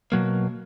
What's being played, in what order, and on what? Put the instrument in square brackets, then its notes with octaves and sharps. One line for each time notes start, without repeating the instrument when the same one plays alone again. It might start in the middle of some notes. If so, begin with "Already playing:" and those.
[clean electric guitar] B2 F#3 A#3